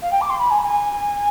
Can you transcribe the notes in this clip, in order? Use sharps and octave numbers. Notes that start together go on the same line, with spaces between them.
F5
G5
D6
C6
B5
G#5
B5
G#5